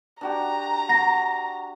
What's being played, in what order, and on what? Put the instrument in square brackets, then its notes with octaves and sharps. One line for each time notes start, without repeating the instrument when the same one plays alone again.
[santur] D4 F#4 G4 [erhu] A#5
[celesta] F#5 A#6